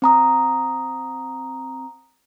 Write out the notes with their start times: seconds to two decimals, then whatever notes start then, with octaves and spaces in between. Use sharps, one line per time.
0.02 C4 A#5 D#6